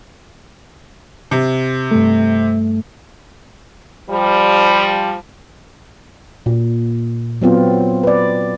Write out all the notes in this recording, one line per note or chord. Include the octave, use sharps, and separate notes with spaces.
C3
G2 A3
F3 G3
A#2
F#3 B3 C4 F4
B4 D5